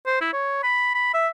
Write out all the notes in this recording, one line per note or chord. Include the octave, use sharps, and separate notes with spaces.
C5
E4
C#5
B5
B5
E5